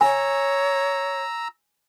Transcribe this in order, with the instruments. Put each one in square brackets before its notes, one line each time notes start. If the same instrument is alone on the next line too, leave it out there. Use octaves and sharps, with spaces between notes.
[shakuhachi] C#5 [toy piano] G#5 [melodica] A#5 E6